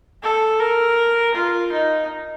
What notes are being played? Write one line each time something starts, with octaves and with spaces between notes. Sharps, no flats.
A4
A#4
F4
D#4